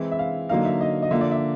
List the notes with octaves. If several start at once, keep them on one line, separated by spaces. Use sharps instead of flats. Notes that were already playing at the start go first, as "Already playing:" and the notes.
Already playing: E3 G#3 C4 E4
E5
F5
D3 F#3 A#3 D#4 F5
E5
D#5
D#5
D3 F3 A#3 E5
D5
E5